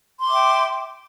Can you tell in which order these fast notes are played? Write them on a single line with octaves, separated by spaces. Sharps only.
C6 D6 E5 G5